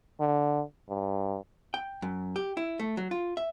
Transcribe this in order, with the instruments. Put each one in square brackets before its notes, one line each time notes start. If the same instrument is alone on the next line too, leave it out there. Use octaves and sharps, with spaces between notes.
[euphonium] D3
G2
[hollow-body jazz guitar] G5
F#2
G4
E4
A3
F#3
F4
E5